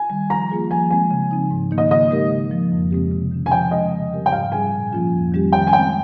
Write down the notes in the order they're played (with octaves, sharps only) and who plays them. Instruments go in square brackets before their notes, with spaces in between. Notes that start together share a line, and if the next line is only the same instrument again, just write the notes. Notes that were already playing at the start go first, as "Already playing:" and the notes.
Already playing: [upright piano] G#5
[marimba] D#3 G3
[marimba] F3 [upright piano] A#5
[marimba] A#3 F4 G#4
[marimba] F3 [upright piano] G#5
[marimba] G#3 C4 [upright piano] G#5
[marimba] C#3
F3 C4 D#4
G#2
D#3 A#3 D#4
[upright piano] D#5
[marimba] C#3 [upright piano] D#5
[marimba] G#3 D#4 G4 A#4
C#3
F3 A#3
F2
C#3 G#3 C4 G4
C3
D#3 G#3 C#4
[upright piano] G#5
[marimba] F3 [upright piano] G5
[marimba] G#3 C#4 [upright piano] D#5
[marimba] C#3
G3 C4 G4 A#4
[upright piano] G5
[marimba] G#2 [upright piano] F5
[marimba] G3 C#4 G#4 [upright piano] G#5
[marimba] A#2
F3 A#3 C#4 F4
F2
D#3 G3 C#4 G4
[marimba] D#3 [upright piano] G5
[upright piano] G#5
[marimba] G#3 C4 [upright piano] G5